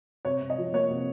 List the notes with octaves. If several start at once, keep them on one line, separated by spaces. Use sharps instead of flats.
C3 C#5
C3
D#5
F3
A#3 C#5
C3